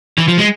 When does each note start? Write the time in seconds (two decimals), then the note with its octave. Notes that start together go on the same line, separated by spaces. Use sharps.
0.18 E3
0.28 F3
0.38 G#3